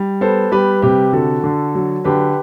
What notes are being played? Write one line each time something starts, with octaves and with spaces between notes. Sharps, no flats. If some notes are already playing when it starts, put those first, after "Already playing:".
Already playing: G3
B3 A4 C5
G3 G4 B4
C3 G4 B4
D3 F#4 A4
D3
F#3
D3 G4 B4